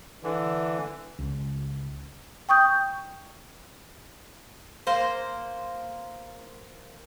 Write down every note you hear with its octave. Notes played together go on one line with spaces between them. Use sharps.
D3 E3
C#2
G5 C#6 D#6 G6
A#3 C5